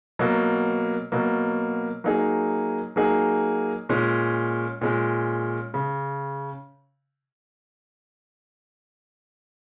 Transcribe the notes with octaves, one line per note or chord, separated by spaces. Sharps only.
B2 F#3 A#3
B2 F#3 A#3
F#3 A#3 D#4 G#4
F#3 A#3 D#4 G#4
A#2 G#3 C#4
A#2 G#3 C#4
C#3